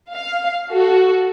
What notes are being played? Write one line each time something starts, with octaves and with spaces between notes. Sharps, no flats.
F5
F#4 A4